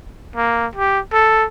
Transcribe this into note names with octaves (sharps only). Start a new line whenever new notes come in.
A#3
G4
A4